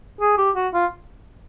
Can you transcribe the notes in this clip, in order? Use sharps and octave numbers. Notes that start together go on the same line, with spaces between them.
G#4
G4
F#4
F4